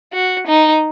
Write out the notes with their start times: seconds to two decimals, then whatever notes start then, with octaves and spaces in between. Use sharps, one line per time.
0.13 F#4
0.47 D#4